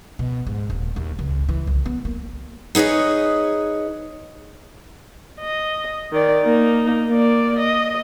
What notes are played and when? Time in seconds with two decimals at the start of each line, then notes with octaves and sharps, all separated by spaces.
0.19 B2
0.47 G#2
0.70 D#1
0.96 D#2
1.19 C#2
1.49 E3
1.67 C2
1.86 B3
2.05 A#3
2.75 D#4 G#4 B4 C#5 D#5
5.40 D#5
6.12 D#3 D5
6.44 A#3 D#4
7.10 A#3 D5
7.59 D#5